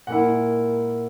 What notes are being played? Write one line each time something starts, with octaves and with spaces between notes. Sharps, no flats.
A#2 A#3 E4 F#5